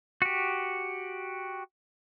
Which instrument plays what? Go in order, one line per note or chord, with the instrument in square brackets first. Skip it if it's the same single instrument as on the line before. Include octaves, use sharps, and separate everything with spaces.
[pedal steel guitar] F#4 G4